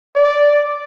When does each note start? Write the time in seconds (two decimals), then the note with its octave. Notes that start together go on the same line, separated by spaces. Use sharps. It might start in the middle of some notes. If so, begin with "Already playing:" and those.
0.16 D5